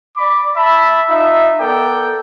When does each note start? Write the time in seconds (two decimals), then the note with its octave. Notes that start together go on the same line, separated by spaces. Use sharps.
0.16 D5 B5 D6
0.56 E5 A5 B5
1.08 D#4 F4 E5
1.59 B3 A4 A#4 D5 G5